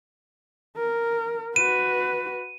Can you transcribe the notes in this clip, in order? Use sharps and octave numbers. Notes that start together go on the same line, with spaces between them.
A#4
F#4 B4 D#7